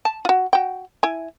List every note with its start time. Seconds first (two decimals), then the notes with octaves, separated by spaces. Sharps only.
0.05 A5
0.25 F4 F#4
0.53 F#4 G5
1.03 E4 G#5